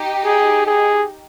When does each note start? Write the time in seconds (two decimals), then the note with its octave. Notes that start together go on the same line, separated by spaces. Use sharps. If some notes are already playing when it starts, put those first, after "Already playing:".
Already playing: D#4 G4
0.24 G#4
0.67 G#4